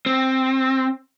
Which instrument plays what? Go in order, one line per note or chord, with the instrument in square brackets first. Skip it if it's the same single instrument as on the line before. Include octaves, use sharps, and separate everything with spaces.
[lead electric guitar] C4